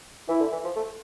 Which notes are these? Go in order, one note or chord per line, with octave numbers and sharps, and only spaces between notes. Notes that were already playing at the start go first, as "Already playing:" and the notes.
E3 E4
D3
E3
F3
A3